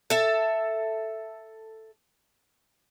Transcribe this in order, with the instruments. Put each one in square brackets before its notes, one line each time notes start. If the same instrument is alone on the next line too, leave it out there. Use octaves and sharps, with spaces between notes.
[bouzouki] A4 E5